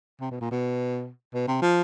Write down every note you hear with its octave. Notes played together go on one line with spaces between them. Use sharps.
C3
B2
A#2
B2
B2
C3
F3